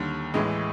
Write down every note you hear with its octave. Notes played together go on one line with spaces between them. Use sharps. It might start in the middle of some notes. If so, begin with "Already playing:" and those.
Already playing: D#2 D3 G3
A1 A2 E3 G#3